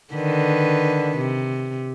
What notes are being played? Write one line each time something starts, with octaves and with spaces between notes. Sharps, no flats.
D3 D#3 B4
C3